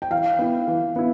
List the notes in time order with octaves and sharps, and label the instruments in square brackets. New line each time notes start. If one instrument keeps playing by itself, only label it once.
[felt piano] G5
[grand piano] E3 [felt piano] F5
[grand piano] B3 E4
E3
B3 E4